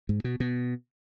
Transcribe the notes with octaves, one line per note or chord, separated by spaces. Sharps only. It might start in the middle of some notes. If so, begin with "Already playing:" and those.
G#2
B2
B2